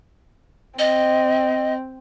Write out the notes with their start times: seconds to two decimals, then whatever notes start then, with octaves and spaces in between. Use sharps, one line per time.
0.79 C4 D#5